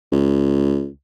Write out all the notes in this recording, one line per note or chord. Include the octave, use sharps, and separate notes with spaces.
C#2